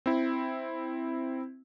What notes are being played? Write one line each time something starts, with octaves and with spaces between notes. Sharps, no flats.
C4 E4